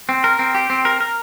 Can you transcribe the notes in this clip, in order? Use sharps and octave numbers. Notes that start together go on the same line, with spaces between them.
C4
A#4
C4
G4
C4
A#4
A#4